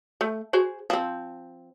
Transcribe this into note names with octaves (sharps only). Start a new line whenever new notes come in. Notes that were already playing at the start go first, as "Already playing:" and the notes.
A3
F#4 G#4 C5
F3 C4